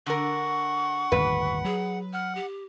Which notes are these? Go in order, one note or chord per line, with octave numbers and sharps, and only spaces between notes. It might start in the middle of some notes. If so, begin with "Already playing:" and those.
D3 A#4 F#5 C#6
G1 D#2 A2 B4
F#3 G#4
F#5 F6
G4